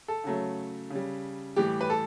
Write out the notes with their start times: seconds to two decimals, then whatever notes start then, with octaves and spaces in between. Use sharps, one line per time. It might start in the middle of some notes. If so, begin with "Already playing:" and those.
0.08 A4
0.24 C#3 F#3 A3
0.90 C#3 G3
1.56 A2 E3 G3 G4
1.81 B4
1.90 A4